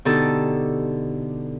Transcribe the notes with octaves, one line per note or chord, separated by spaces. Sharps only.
B2 D3 D#4 G4 A4